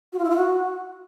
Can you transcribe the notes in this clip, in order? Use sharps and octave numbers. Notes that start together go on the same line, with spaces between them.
F#4
F4
E4
F4
F#4